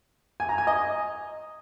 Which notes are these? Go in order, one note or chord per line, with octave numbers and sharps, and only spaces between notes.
G#5
A#5
G#5
D#5